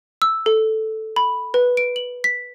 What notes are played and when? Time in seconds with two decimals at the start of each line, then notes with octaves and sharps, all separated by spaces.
0.22 E6
0.46 A4
1.16 B5
1.54 B4
1.77 D7
1.96 F#7
2.24 B6